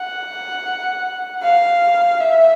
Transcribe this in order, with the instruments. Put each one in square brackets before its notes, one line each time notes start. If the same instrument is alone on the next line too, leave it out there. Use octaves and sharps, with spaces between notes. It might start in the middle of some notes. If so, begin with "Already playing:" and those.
Already playing: [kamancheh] F#5
F5
E5